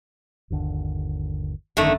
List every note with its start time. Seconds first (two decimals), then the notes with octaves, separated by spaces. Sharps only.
0.50 G1 D#2 D3
1.77 G#1 F#2 D3 D#3 A3 C#4